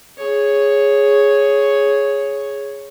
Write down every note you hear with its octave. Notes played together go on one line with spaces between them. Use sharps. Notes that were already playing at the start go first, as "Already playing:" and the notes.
G#4 C#5